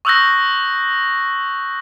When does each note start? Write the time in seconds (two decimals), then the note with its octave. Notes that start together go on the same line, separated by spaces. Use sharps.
0.05 C#6 D#6 E6 F#6 G6 A#6